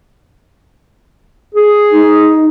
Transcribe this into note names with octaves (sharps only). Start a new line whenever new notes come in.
G#4
D#4